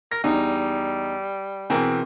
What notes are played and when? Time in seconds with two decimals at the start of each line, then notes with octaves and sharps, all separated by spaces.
0.12 A#4 A#6
0.24 E2 G3 D#4
1.70 B2 E3 C4 G#4 A#4 G#5